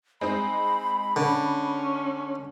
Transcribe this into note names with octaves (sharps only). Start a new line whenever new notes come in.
G#3 C4 D#4 B5
D3 C#4